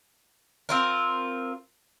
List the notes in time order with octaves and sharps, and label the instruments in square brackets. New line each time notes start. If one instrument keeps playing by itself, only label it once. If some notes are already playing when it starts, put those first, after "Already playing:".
[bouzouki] C4 F4 A#4